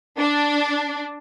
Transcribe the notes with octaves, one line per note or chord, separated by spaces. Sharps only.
D4